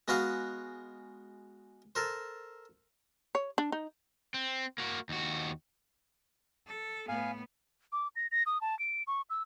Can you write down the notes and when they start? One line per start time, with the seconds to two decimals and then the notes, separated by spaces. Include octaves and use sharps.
0.08 G#3 B3 F#4 B4 F5
1.95 A4 A#4 C5
3.35 C#5
3.58 D4
3.72 D#4
4.34 C4
4.78 A#3 F#4
5.09 D#2 F#4
6.67 A4
7.08 A2 B3 F5 G#5
7.92 D6
8.16 A#6
8.32 A#6
8.46 D#6
8.61 A5
8.79 D7
9.07 C#6
9.30 E6